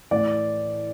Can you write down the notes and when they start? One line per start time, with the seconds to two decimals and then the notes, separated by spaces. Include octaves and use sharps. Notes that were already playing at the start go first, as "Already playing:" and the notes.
0.11 A2 E3 D5